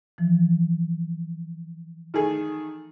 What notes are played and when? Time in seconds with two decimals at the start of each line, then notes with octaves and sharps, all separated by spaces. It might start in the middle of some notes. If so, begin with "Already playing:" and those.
0.18 E3 F3
2.14 D#3 A3 G#4